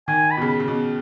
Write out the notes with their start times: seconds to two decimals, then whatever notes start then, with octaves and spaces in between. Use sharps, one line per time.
0.08 D#3 G#5
0.31 B5
0.37 B2
0.42 C#3
0.60 C#3
0.68 B2